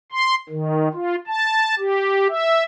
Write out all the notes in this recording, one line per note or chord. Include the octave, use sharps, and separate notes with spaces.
C6
D#3
F4
A5
G4
E5